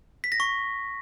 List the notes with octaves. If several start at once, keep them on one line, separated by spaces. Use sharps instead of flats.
B6
A#6
C#6